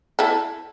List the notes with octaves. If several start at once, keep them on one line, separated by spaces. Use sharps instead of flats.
E4 A4